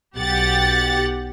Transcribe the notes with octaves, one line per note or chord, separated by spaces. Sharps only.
B1 G4 F#5 A6